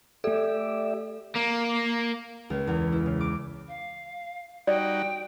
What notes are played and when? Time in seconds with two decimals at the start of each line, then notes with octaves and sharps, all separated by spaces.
0.24 A3 G4 A4 D5 E5
1.35 A#3
2.50 C#2
2.67 E2
2.92 E4
3.06 C#3
3.21 D6
3.68 F5
4.67 G3 D#4 F#4 D5 G5